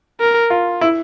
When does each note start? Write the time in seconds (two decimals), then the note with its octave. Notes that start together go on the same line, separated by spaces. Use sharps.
0.20 A#4
0.50 F4
0.81 E4